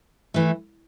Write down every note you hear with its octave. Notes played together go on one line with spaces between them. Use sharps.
E3 A3